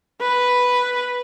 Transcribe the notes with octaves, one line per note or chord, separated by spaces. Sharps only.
B4